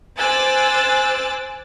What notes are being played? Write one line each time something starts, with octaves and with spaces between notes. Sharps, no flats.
C5 G#5 D6 E6 F#6 A6